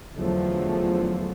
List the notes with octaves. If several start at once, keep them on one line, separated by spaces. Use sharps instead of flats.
E2 D3 F3 F#3 A3